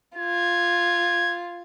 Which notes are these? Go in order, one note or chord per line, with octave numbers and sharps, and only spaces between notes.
F4 G#6